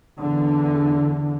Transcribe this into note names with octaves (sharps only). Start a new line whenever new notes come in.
E2 D3